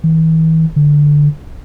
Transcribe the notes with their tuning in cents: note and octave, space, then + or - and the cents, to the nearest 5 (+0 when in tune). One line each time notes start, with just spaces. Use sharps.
E3 -40
D3 +0